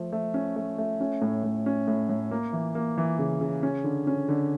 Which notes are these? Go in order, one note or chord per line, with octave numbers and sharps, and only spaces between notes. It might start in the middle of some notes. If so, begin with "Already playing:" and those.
Already playing: F3 A3
A3
C#4
A3
A3
C#4
A2
A2
C#4
A2
A2
A#3
E3
A#3
E3
C#3
C#3
C#4
D3
C#4
D3